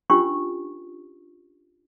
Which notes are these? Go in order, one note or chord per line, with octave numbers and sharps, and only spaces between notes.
C#4 D4 F4 G4 A#4 C#6